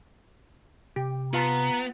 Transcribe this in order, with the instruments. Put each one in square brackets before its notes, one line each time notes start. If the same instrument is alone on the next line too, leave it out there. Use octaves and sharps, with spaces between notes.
[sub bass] C3 [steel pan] G4
[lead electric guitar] B3 [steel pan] F4 F5 A5 [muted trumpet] A#5